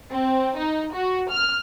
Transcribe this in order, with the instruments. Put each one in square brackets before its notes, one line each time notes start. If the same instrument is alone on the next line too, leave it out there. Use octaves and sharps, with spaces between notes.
[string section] C4
D#4
F#4
F6